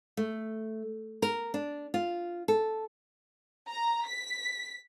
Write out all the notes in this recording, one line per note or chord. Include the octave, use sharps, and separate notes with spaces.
A3
A#4
D4
F4
A4
A#5
B6